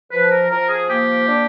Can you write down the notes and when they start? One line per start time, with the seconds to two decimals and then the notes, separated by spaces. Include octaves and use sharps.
0.11 F3 B4
0.31 A#4
0.50 F3 A#4
0.69 G#4
0.88 A#3 G4
1.27 D4